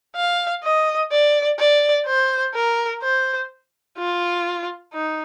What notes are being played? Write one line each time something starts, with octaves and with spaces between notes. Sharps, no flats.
F5
D#5
D5
D5
C5
A#4
C5
F4
D#4